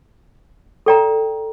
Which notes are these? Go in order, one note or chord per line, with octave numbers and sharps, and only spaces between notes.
A4 D5 G5 A#5